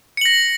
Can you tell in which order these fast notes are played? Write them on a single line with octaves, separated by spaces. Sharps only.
C#7 F#7 A#6